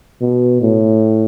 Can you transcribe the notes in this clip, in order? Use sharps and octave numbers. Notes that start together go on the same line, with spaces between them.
B2
A2